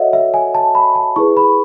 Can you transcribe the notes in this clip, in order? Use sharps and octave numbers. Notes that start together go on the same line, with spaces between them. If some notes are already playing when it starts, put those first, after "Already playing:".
Already playing: F#4 A4 C#5 D#5 E5 F#5
E5
G#5
A5
B5
A5
E4 G#4 B4 C#6
B5